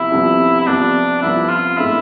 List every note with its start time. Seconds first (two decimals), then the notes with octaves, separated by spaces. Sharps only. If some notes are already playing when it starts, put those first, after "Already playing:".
Already playing: C2 C3 F3 B3 E4
0.12 C2 C3 F3 B3
0.60 E4
0.67 C2 C3 F3 B3 D4
1.22 C2 C3 F3 B3 E4
1.50 F4
1.77 A2 G#3 B3 D4 E4